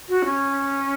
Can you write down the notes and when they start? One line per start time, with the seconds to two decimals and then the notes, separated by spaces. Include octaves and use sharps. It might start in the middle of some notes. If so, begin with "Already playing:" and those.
0.09 F#4
0.25 C#4